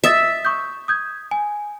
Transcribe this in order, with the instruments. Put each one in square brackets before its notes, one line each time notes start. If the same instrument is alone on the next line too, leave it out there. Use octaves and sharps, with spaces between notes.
[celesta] D#5 D#6 A6 [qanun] E5
[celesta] C#6 D#6 G6
D#6 G6 G#6
G#5